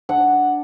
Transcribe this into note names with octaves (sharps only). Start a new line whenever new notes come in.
D4 F#5